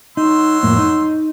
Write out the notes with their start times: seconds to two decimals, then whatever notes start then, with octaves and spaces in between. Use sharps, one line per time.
0.17 F#3 D#4 C6 E6
0.63 F2 A2 A#3
0.78 D#4